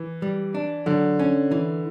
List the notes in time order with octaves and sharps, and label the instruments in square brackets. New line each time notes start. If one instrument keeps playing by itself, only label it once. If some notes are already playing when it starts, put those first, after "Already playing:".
Already playing: [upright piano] E3
[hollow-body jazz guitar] G3
D4
[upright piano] D3 [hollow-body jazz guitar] F#3
[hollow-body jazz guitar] C#4
E3